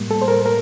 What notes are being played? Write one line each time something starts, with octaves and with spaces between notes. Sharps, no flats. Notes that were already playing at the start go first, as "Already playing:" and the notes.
Already playing: A2 G3 A#3
A4
C5
A#4
A#4